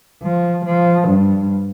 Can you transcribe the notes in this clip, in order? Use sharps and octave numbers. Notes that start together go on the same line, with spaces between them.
F3
F3
G2